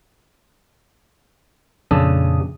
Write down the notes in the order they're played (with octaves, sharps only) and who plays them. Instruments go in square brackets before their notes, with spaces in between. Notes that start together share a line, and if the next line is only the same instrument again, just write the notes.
[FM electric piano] F2 A#2 D#6 [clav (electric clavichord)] C#3 D4 A4